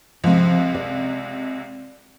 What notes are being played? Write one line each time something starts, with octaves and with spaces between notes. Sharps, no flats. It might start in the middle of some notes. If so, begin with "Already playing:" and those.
C#2 C3 F3
D5